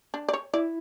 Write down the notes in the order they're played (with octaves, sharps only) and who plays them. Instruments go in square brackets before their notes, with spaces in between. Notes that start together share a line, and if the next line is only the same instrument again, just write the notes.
[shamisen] D4
D5
C#5
[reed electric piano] E4 [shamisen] D5